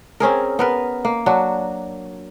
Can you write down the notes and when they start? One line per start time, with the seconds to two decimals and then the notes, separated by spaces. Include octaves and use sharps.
0.20 C4 C#4 G#4 A#4
0.59 B3 A#4 B4
1.05 A#3
1.26 F#3 D4 F#4